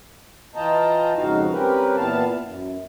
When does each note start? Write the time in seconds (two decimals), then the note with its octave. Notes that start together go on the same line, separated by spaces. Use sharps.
0.56 E3 F4 D#5 G5 A5 A#5
1.15 F2 G#2 C#3 D#4 F#4 F5
1.51 G3 C4 C#4 G4 A#4 B4
1.96 A#2 E3 B3 F5 A5
2.42 F#2